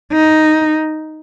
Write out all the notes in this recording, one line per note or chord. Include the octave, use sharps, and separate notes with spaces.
D#4